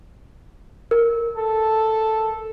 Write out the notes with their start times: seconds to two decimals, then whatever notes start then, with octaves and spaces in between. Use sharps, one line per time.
0.91 A#4
1.37 A4